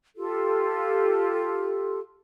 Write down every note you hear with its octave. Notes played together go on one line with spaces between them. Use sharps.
F4 G4 A4